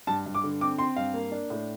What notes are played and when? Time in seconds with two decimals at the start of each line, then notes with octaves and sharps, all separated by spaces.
0.07 G2 A5
0.26 G2
0.35 D6
0.44 D3
0.61 C4 D6
0.78 C4 C6
0.96 G2 F5
1.14 A#3
1.32 D4
1.50 A2